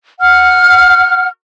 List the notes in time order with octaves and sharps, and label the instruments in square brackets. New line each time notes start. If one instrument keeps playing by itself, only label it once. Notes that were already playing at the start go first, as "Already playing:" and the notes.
[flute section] F#5 F6